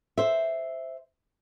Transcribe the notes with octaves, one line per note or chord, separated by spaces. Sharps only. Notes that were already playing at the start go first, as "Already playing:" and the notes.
C5 E5